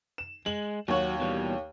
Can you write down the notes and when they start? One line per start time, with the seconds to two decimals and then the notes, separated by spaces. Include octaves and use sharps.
0.18 E7
0.46 G#3 F#7
0.88 D#2 F#3 F#4 C#5
1.20 B2 E3 G3